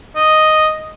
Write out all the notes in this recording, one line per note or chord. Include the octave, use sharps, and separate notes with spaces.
D#5